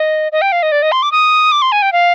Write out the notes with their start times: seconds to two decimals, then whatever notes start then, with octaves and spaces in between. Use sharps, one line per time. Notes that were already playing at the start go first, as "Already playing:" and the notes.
Already playing: D#5
0.32 D#5
0.42 G5
0.52 F5
0.63 D#5
0.72 D5
0.82 D#5
0.92 C6
1.03 D6
1.12 D#6
1.52 D6
1.62 C6
1.72 G#5
1.82 G5
1.92 F5